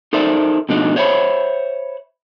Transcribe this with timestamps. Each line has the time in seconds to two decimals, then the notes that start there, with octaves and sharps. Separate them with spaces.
0.13 D#4 A4 A#4 C5 D5 E5
0.69 B2 F3 A3 D4 D#4 F#4
0.96 C5 C#5 E5 F#5 B5